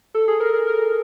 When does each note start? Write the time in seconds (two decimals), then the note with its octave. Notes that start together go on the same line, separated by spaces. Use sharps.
0.15 A4
0.28 G#4
0.40 A#4
0.54 A#4
0.67 A#4